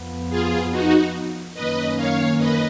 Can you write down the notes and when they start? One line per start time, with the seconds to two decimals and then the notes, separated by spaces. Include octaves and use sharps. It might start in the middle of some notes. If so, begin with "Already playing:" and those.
Already playing: F2 F3 B3
0.30 F4 G#4
0.71 D#4 F#4
1.54 F#2 D#3 A#3 C#4 B4 D#5
1.97 C#5 F5
2.38 B4 D#5